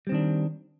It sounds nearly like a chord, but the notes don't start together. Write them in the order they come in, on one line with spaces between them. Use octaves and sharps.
G3 C4 D#3 D4